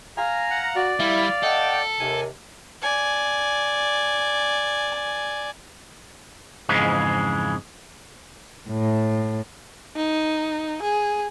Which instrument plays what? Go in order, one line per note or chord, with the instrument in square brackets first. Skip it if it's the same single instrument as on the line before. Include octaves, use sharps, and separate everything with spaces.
[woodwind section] F5 A#5 [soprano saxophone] G#5
[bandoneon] F#5
[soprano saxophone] F#4 [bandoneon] D5
[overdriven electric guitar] G3 [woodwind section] E4 [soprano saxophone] F5
[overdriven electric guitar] A4 [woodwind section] D#5 F#5 G5
[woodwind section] D#2 C3 [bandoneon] G#5
[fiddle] D5 G#5
[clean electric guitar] F2 G#2 C#3 E3 G#3
[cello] A2
[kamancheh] D#4
G#4